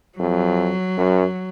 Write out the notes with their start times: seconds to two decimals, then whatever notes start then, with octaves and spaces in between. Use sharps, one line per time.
0.19 F2 F#3
0.97 F#2